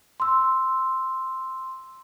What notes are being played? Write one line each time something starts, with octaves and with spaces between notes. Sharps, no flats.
C6 E6